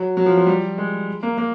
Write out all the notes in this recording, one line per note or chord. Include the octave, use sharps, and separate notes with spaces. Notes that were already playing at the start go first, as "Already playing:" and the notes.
Already playing: F#3
F#3
F3
F3
G3
G#3
A#3
A#3